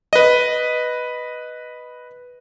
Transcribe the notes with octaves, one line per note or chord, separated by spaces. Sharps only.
B4 D#5